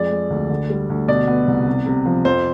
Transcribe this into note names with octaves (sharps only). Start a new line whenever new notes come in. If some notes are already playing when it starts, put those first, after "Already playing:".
Already playing: F2 G#3 D5
G#3
D2
D3
G3
D2
B2 D5
B3
C2
C3
C3
F3
F2 C5